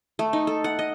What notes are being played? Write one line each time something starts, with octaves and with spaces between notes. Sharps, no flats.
A3
D#4
A4
F#5
D#5